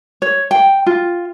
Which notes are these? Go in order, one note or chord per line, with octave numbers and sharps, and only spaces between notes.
C#5
G5
F4